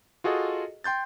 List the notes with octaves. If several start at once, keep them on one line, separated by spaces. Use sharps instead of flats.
F4 F#4 G#4 A4 D#5
G5 C6 G6 A6